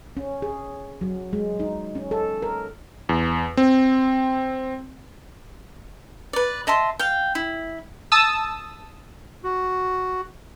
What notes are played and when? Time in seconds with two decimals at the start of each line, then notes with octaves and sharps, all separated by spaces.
0.17 C#4
0.42 G#4
1.01 F#3
1.33 G#3
1.60 D#4
1.95 C#4
2.11 A4
2.42 A#4
3.09 E2
3.57 C4
6.33 B4 D5
6.67 D#5 E5 A5 C6
6.99 F5 G5
7.35 E4
8.12 A5 D#6 E6
9.44 F#4